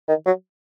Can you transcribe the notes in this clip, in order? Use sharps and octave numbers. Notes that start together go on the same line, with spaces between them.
D#3
F#3